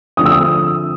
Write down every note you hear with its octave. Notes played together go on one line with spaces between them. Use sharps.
D3 F3 A3 C4 D#6
E6
D#6